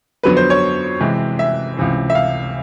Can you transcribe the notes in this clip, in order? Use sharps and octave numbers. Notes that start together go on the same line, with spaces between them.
F2 D3 F#3 B3 B4
C5
C#5
C3 E3 G#3 C4
E5
C#2 C3 E3
E5
F5